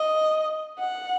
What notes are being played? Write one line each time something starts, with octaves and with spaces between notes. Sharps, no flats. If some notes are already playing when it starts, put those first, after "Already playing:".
Already playing: D#5
F#5